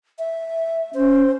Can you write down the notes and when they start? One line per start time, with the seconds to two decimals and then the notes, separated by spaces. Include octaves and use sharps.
0.19 E5
0.94 C#4 C5